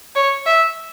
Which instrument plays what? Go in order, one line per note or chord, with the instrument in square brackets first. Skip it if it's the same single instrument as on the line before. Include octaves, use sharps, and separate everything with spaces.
[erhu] C#5
E5